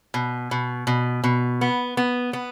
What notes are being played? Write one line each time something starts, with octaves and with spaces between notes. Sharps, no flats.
B2
B2
B2
B2
B3
B3
B3